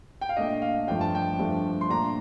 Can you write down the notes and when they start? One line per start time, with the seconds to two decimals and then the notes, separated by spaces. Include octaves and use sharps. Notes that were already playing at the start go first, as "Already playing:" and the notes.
0.21 G5
0.29 F5
0.37 A#2 A3 D4 D#5
0.62 F5
0.87 G2 F3 A3 D4 G5
1.01 A5
1.15 G5
1.39 G2 F3 A3 D4
1.81 C6
1.89 A#2 A3 D4 A#5